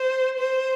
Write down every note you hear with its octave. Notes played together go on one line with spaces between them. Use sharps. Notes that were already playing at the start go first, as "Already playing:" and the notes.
Already playing: C5
C5